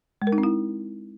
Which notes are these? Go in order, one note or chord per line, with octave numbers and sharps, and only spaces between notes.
G#3
A#4
D#4
C4
E4